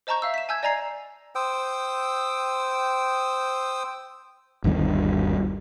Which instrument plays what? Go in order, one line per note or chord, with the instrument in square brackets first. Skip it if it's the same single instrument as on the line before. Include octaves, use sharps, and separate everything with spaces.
[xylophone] C5 D#5 A5 A#5 C#6 G6
E5 F5 E6
B6 E7
G#5 A5 E6 G6 G#6
D5 D#5 G#5 A#5 G#6 C7
[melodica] C5 G5 D#6 E6
[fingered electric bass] G1 D#2 D3 G3